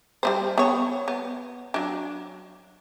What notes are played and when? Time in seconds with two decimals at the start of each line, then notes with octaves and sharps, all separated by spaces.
0.23 G3 B3 C5
0.58 B3 C#5
1.08 B3
1.74 F#3 D4